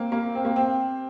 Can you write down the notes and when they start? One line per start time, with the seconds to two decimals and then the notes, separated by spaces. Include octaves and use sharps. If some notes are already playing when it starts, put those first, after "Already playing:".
Already playing: A#3 C4
0.12 A#3
0.35 C4
0.45 A#3
0.56 C4